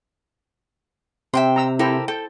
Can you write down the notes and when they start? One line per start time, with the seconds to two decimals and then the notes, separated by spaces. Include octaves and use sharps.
1.33 C3 E5 G5 C6
1.56 A#5 E6
1.79 E4 G4 A4 A#4 C5
2.08 A4 G5